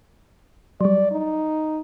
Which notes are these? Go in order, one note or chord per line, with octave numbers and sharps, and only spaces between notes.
F#3 G3 D5
D#4